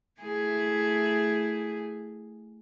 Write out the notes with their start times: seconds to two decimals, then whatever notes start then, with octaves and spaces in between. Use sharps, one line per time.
0.21 A3 E4 G#4